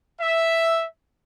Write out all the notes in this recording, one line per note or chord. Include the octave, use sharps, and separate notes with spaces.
E5